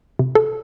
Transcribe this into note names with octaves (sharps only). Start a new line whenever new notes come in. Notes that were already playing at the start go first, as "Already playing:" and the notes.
C3
A4